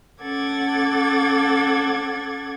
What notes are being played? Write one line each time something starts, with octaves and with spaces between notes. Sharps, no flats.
C#4 A4 F#5 D6 G#6 A6